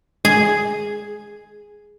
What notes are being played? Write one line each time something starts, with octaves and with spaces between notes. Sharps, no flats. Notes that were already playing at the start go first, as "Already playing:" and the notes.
G#3 G#4